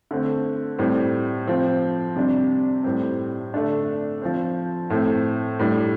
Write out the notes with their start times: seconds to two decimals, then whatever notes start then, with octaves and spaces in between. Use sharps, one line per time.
0.11 D3 A3 C4
0.79 A2 G3 C4
1.47 F3 C4
2.16 C3 G3 D4
2.84 A2 G3 C4
3.54 D3 A3 D4
4.22 F3 C4
4.90 A2 A3 C4
5.59 A2 G3 D4